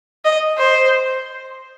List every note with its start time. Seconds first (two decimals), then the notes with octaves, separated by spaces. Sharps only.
0.25 D#5
0.58 C5